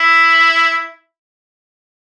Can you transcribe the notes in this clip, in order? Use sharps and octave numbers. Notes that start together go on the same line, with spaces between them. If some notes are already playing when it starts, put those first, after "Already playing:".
Already playing: E4